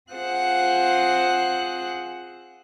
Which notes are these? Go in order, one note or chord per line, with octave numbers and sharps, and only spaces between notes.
C4 F4 G#4 C5 F#5 F#6